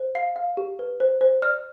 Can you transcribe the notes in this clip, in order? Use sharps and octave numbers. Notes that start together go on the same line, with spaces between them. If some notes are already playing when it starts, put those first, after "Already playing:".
Already playing: C5
F5 C7
F5
G4
B4
C5
C5
D5 F6